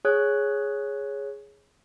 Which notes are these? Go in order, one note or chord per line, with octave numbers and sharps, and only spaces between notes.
G#4 C#5 F#6